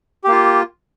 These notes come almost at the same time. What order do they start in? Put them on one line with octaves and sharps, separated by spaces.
G4 A#3 F4